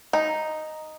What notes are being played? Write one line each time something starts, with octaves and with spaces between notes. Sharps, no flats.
D#4